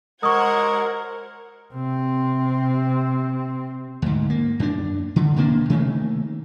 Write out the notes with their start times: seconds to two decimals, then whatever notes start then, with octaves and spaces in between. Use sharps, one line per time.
0.23 G#3 A#4 C5 F#5 C#6 D#6 G#6
1.73 C3 C4
4.02 D2 G#2
4.30 A#3
4.60 F#2 D4
5.16 D3
5.36 E1 C3 A#3 D4
5.70 C3 D#3 A3 A#3